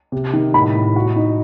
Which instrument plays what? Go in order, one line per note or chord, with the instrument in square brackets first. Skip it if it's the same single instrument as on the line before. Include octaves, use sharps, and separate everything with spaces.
[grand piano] C3
D#3
[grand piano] A2 [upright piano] B5
[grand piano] A2
F#4
D#4